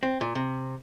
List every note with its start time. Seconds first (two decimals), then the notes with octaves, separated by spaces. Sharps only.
0.03 C4
0.21 A#2
0.35 C3